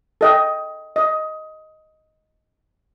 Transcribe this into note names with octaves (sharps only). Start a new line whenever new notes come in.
A4 D#5 G5
D#5